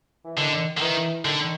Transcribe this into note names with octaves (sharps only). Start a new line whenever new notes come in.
E3
D3 D#3
D3
D#3 E3
D3 D#3